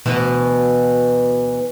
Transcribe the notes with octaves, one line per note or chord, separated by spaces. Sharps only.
D2 B2 E3